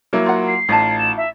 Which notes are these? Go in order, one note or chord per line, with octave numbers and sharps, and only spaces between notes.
F#3 A#3 E4
F4 F#5
C7
A1 D#4 F4 A5
E7
E5